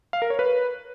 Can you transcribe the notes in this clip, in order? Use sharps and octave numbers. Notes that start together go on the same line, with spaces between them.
F5
A#4
C#5
B4